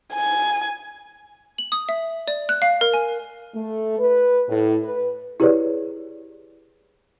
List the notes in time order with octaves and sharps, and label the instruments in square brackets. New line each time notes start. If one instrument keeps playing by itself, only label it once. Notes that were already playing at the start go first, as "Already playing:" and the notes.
[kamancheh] G#5
[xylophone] F#7
D#6
E5
D5
F#6
F5
A#4
G#5
[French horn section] A3
B4
A2
B4
[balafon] E4 G4 G#4 B4 C#5 D5